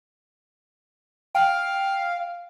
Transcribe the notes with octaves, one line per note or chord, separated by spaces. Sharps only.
F5 G5